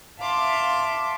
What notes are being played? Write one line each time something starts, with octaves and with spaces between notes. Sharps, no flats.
E5 F5 A5 C6 D6